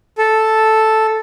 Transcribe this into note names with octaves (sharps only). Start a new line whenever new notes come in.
A4